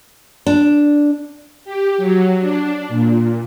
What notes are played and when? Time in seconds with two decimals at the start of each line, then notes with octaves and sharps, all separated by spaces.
0.46 D4
1.65 G4
1.98 F#3
2.40 D4
2.89 A#2